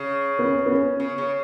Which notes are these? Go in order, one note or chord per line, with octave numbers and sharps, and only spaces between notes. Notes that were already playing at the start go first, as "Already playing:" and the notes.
Already playing: C#3
B3
C#4
B3
C#4
C#3
C#3